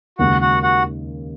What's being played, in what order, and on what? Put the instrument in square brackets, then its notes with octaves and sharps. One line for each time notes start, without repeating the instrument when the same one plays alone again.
[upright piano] D#2 C#3 G#3 [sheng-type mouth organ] F#4 F#5
[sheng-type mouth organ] F#4 F#5
F#4 F#5